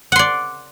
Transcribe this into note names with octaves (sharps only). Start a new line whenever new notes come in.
D5 F#5 C6